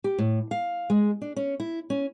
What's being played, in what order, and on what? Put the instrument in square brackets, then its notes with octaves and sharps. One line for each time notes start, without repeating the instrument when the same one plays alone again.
[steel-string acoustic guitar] G4
A2
F5
G#3
D4
C#4
E4
C#4